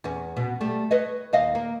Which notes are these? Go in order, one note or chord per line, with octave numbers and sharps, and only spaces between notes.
E2 C#4
B2
G3 A3
B4 C#5 D#5
D#2 D#5 F5
A#3